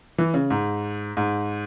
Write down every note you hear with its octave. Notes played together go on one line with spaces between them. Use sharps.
E3
C#3
G#2
G#2